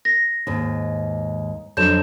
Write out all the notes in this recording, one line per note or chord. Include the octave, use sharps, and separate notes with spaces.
A#6
D#2 G#2
F2 D3 F#3 G6 E7